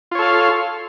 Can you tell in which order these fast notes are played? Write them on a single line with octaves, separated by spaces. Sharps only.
F4 C#5 A4 F5